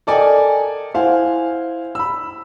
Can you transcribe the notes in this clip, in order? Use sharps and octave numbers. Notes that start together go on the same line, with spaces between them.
A4 A#4 D5 D#5 G5 G#5
E4 C5 F5 F#5 G#5
B5 E6